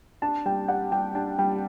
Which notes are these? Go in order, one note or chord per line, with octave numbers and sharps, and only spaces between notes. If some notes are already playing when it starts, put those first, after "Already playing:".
D4 A5
G3 G5
G4 F#5
G3 G5
D4 A5
G3 G5